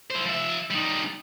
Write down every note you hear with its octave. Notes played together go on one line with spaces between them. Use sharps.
E4 C5
F3 E5
G3 D#4